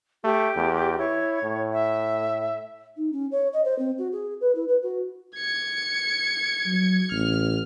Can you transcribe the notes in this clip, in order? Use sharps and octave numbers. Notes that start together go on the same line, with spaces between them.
A3 G4
E2
E4 C#5
A2
E5
D#4
C#4
C#5
D#5
C5
C4
F#4
G#4
B4
E4
B4
F#4
G#6 C#7
F#3
A1 F6